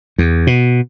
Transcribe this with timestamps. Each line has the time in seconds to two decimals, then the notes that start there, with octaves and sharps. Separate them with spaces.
0.18 E2
0.47 B2